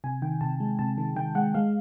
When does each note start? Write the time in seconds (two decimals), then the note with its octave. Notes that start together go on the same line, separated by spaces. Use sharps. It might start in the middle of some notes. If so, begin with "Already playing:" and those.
0.04 C3 G#5
0.22 D#3 G5
0.41 C3 A5
0.60 G#3
0.79 C3 A5
0.98 D#3
1.16 D#3 G5
1.35 G#3 F#5
1.54 G#3 F5